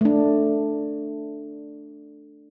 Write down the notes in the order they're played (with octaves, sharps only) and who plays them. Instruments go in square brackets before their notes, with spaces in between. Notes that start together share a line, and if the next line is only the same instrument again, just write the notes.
[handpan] A3 D4